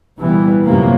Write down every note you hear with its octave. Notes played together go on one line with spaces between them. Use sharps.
C2 A#2 E3 G3 B3
F#2 C3 F3 F#3 A#3